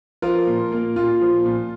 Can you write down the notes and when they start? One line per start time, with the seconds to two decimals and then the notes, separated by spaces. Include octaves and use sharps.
0.22 F3 F4 A#4
0.47 A#2
0.72 A#3
0.96 A#2 F4
1.21 F3
1.46 A#2